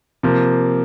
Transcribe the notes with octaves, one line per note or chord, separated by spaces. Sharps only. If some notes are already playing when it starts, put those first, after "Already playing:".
C3 F3 A#3